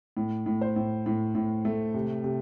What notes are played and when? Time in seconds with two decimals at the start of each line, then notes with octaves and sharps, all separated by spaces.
0.17 A2
0.46 A2
0.61 C5
0.76 A2
1.06 A2
1.35 A2
1.65 A3
1.94 C3
2.24 C3